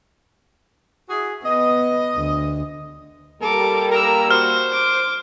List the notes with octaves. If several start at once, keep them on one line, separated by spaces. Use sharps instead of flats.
E4 F#4 G#4
B3 D#5
D2
G3 A#3 A4 A#4 D6
A#4 A#5 E6
F#4 C5 F6
D6